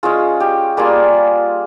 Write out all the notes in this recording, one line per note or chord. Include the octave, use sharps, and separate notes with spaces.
G#3 C#4 F4 G#4
G4
G3 A#3 F4 G#4